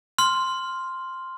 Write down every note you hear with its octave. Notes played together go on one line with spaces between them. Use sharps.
C6 F6